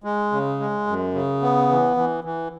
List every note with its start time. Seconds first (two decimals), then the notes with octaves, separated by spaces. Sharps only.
0.04 G#3
0.32 C#3
0.60 G#3
0.87 F#2
1.14 C#3
1.42 B3
1.70 E3
1.97 E3
2.24 E3